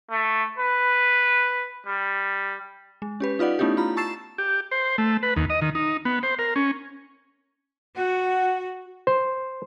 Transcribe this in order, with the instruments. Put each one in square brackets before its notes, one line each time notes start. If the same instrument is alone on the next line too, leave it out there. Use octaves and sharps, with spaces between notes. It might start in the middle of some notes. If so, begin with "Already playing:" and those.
[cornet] A3
B4
G3
[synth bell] G#3
C#4 G4 B4
D#4 F4 B4 D5 F#5
A3 B3 C#4 D#4 E4 G4
F4 A#5 B5
A5 C#6 E6 A6 C7 E7
[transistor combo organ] G4
C5
A3
B4
D#2
D#5
D#3
D#4
B3
C5
A#4
C#4
[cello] F#4 [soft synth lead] F#5
[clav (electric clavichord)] C5